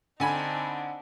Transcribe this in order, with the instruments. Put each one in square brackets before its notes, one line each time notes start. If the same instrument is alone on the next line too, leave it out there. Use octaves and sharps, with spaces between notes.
[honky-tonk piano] D3 G#5 B5 [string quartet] C4 D4 D#4